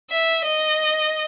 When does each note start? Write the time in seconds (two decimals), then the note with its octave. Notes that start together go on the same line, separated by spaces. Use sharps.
0.10 E5
0.45 D#5